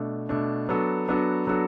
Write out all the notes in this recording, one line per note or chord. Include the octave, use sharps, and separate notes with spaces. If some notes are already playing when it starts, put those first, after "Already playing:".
Already playing: B2 A3 D4
B2 A3 D4
F#3 B3 D4 F#4 A4
F#3 B3 D4 F#4 A4
F#3 B3 D4 F#4 A4